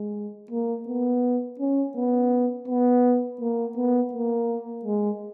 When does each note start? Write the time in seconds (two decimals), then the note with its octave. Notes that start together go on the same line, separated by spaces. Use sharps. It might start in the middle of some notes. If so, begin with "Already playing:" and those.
Already playing: G#3
0.51 A#3
0.88 B3
1.59 C#4
1.96 B3
2.68 B3
3.41 A#3
3.76 B3
4.13 A#3
4.85 G#3